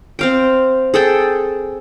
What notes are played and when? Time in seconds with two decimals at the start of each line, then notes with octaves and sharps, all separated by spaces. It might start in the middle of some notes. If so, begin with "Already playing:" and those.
0.19 C4 F5 G5
0.94 G#4 A4 G5